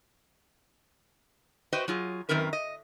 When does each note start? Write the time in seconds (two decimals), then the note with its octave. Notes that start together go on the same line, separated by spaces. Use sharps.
1.72 F#4 B4 C5 D#5 G5
1.88 F#3 F4 G#4
2.29 F#2 B2 D#3 C4 A#4 B4
2.53 D#5